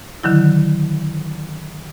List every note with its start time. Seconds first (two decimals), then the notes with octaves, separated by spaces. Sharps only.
0.23 D3 D#3 F#3 E4